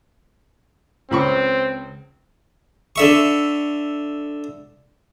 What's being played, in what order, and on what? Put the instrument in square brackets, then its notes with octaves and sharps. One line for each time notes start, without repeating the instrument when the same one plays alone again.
[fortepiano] C#2 B5 C#6 [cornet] C4
[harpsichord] D3 E5 C#6